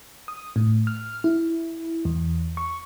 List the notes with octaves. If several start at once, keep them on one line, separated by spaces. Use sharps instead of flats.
D#6
A2
F6
E4
E2
C#6